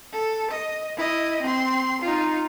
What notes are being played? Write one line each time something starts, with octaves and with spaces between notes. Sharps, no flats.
A4
D#5
E4 D#5
C4 C6
D#4 F4